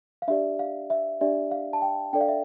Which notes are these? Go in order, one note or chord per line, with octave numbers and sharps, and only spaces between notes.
F5
D4 G4 D5 E5
F5
E5
D4 G4 D5 E5
F5
A5
G5
D4 A4 D5 G5
F5
E5